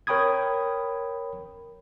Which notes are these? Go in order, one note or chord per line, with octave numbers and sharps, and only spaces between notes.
A#4 C#5 G5 B5 D#6 G#6